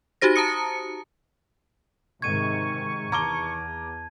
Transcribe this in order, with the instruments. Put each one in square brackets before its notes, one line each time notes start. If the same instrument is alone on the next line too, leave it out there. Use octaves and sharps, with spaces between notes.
[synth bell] D#4 F#4 G4 C5 A#6
A5 A#5 D#6 C#7
[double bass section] G#2 C3 D#3 [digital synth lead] C#6 [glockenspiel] G#6 D#7
[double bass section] E2 [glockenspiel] A5 G#6 [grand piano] A#5 D6 G7